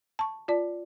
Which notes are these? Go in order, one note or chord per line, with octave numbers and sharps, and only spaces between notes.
A5 C#6
F4 D5 A5